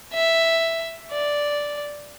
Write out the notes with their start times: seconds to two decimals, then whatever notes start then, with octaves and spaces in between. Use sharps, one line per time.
0.13 E5
1.11 D5